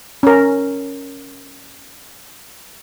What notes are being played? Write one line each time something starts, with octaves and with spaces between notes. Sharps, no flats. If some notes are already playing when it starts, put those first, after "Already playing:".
C#4 A#4